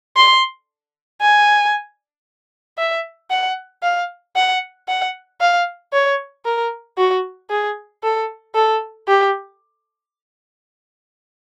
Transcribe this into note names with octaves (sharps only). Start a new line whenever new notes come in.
C6
G#5
E5
F#5
F5
F#5
F#5
F5
C#5
A#4
F#4
G#4
A4
A4
G4